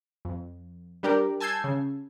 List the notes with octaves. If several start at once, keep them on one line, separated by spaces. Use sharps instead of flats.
F2
G3 D4 G4 A#4 D5
G#5 A5 E6 G6 G#6 C7
C#3